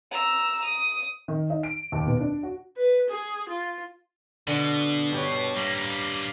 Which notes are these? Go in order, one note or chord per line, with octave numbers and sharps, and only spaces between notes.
A#5 E6
D#6
D#3
D#4
D7
D#2
B2
D4
F#4
B4
G#4
F4
B2 D3
G2 G4 C#5
G3 A#3